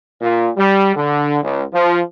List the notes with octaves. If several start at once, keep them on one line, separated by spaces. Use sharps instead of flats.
A#2
G3
D3
C#2
F3